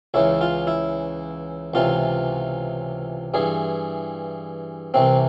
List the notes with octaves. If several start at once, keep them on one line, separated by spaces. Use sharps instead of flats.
C#2 C#3 E3 E4
F4
E4
C#2 C3 E3 F4
G2 E3 G#4
C2 C3 E3 C4